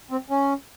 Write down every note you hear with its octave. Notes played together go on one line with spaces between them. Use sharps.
C4
C#4